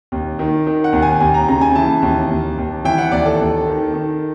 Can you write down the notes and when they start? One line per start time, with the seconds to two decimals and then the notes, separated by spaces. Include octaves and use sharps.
0.12 D#2
0.39 D#3
0.67 D#3
0.84 F#5
0.93 D#2
1.02 G#5
1.21 D#2 G#5
1.34 A#5
1.48 C#3 A#5
1.61 G#5
1.75 E3 A5
2.02 D#2
2.30 D#2
2.58 D#2
2.85 E3 G5
2.98 F#5
3.12 D#2 D5
3.25 A4
3.40 D#2
3.67 D#3
3.94 D#3